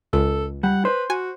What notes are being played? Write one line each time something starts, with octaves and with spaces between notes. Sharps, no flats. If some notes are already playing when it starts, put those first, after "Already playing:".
C#2 A4
G3 F#5
B4 C5
F#4 G#5